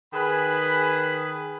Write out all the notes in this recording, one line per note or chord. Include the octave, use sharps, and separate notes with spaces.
D#3 G#4 B4 B5